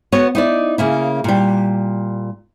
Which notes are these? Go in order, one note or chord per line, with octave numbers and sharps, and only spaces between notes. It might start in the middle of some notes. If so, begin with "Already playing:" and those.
B3 F#4 B4 C#5
D#4 E4 D5
C#3 A#3 E4
A#2 G3